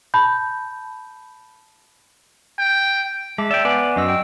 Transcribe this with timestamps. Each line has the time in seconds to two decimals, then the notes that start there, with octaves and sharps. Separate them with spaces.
0.14 A5 B5 G6
2.58 G5
3.38 G#3 E5 A5 D6
3.51 D5 E5 G5
3.65 B3 B4 D5 G#5
3.96 F#2 F#4 D#5 E6
4.08 G5 E6